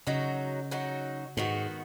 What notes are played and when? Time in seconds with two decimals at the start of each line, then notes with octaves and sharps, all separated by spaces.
0.07 C#3 F#3 D#4 F#4
0.71 F#3 D#4 F#4
1.37 G#2 D#3 B3 F#4